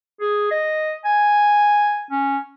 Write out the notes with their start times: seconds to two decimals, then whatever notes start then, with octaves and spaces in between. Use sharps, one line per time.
0.21 G#4
0.51 D#5
1.05 G#5
2.11 C#4